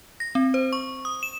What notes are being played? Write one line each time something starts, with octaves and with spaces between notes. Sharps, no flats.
A#6
C4
C5
C#6
D#6
E7